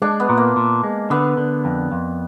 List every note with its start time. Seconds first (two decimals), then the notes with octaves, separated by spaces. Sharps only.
0.02 G#3 D4
0.20 B3
0.29 A#2
0.37 A#3
0.56 A#2
0.84 G#3
1.10 D3 B3
1.37 D3
1.65 F2
1.92 F2